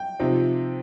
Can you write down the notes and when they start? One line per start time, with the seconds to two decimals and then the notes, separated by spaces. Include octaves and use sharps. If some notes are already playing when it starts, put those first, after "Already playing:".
Already playing: G5
0.20 C3 F3 C4 D#4